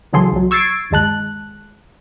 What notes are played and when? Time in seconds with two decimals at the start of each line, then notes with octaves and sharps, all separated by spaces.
0.13 C#2 E3 F#3 G#4 A4 C6
0.32 B1 F#3
0.51 C#6 E6 G#6 A6 C7 D7
0.90 G1 D#2 G#3 A5 F#6